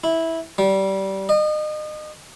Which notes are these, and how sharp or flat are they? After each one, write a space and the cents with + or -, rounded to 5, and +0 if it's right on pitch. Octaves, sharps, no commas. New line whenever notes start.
E4 -10
G3 -20
D#5 -35